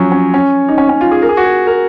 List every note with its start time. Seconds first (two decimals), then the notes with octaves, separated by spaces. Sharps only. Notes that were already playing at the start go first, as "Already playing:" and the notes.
Already playing: F3 F#3 C#4
0.12 C#4
0.34 C#4
0.68 D#4
0.78 C#4
0.89 C#4
1.01 F4
1.11 G#4
1.22 A#4
1.29 G#4
1.37 F#4
1.44 G#4
1.67 A#4